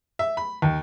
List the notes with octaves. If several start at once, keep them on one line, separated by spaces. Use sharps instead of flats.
E5
B5
D#2